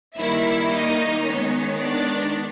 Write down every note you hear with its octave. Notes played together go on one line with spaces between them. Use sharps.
D#3 G3 A#3 E4 E5
D#4 D#5
D#3 G#3 B3 C#4 C#5
D4 D5